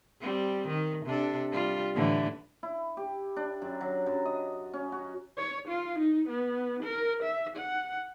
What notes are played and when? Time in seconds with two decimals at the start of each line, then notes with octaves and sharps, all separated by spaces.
0.20 G3 C4
0.68 D#3
1.05 C3 D4 A4
1.52 G3 F4
1.94 A2 D3 E3
2.63 E4
2.97 G4
3.36 D4
3.62 F#2
3.81 F#3
4.06 F#2
4.25 D#5
4.73 C#4
4.92 F#4
5.38 C#5
5.68 F4
5.99 D#4
6.29 B3
6.83 A#4
7.23 E5
7.56 F#5